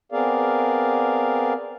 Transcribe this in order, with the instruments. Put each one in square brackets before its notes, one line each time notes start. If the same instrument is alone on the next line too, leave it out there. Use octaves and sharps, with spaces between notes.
[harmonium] B3 C4 G#4 A#4 D5 F5